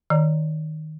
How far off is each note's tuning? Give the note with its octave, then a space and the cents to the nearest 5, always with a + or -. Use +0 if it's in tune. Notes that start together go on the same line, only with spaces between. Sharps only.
D#3 +0 D5 +45 A#5 +0